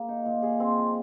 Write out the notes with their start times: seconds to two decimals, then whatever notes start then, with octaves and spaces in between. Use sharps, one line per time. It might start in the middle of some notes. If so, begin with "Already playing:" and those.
Already playing: A#3 G#4
0.08 D#4
0.25 A#2
0.42 G#4
0.60 C4
0.77 F3